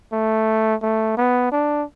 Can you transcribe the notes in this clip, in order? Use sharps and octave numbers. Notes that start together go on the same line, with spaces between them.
A3
A3
B3
D4